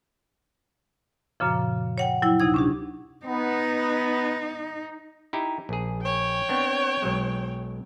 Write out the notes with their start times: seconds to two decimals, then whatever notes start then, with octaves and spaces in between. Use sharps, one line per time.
1.40 F#2 A#2 C#3 F3
1.98 C#5 F#5 G5
2.22 F#3 E4 G5
2.40 D2 C3 D#4 G#6
2.54 C#4 D4 G4
3.26 B3 D#4
5.33 D#4 E4 G4
5.69 A#1 G#4
6.02 C#5 G5
6.49 B3 C4 D4
7.02 B1 F#3 G#3